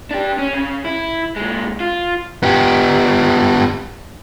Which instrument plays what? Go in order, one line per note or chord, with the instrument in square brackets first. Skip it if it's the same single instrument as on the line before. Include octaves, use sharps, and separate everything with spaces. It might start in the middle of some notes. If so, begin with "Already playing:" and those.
[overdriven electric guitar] D4 G4
C#4
C#3
E4
A#2 G#3
F4
[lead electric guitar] B3 G4